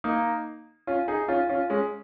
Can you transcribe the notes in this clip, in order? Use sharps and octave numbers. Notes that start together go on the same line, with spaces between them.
A#3 D#4
C#4 F4
D#4 G#4
C#4 F4
C#4 F4
G#3 C#4